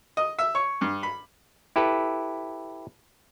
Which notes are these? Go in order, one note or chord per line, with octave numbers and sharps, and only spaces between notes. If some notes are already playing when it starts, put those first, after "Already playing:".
D#5
E5
C#5
G2
B5
E4 G4 A4 B4